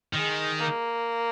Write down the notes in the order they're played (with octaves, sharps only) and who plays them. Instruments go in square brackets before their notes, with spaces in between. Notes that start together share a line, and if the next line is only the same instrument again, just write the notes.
[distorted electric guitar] D#3 [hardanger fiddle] G#3
[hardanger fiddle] A#3